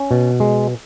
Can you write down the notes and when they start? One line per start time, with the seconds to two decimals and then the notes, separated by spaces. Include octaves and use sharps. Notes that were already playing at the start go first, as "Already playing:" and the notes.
Already playing: C#4
0.11 B2
0.40 G#3